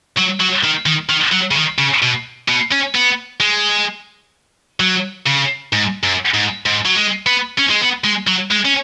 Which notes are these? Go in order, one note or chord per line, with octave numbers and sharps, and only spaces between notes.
F#3
F#3
D#3
D#3
D#3
F#3
C#3
D#3
C#3
B2
B2
C#4
B3
G#3
F#3
C#3
G#2
F#2
G#2
G#2
F#3
G#3
B3
C#4
G#3
B3
G#3
F#3
G#3
C#4